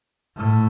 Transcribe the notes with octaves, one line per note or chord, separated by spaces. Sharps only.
A2